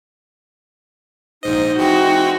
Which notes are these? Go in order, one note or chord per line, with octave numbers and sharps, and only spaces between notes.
A#1 G#2 D#4 C5 D#5
E3 G#3 C4 F#4 G5